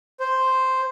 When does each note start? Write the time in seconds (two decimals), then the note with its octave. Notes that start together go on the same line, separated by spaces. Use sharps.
0.20 C5